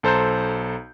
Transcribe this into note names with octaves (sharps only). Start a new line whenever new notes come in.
B1 A4 C5 A#5 G6